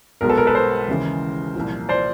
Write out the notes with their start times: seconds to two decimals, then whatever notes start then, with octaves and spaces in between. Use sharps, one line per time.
0.21 B1 B2 G#3 A#4
0.29 A4 B4
0.38 A#4
0.47 A4 B4
0.55 A#4 C5
0.88 D#2 C#3 E3 G#3
1.55 C2 A#2 F3
1.89 C5 D5